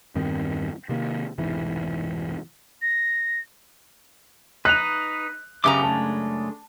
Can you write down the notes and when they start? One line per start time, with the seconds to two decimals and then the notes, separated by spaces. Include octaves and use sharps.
0.15 E2 G2 D#3 C4
0.89 C3 D#3 A#3
1.38 F1 B1 G#2 E3
2.82 A#6
4.65 D#4 B4 D#5 F#6 F7
5.64 F#2 C#3 B3 G4 A#5 D6
5.83 G#3 A3 D4 A5